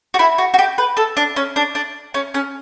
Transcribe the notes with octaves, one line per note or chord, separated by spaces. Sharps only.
F#4
E4
F#4
F#4
G4
B4
A4
D4
C#4
D4
D4
C#4
C#4